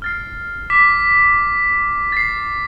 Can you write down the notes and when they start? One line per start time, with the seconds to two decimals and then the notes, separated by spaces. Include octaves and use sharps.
0.02 F6 A6 C7
0.70 D6 B6
2.12 A6 C7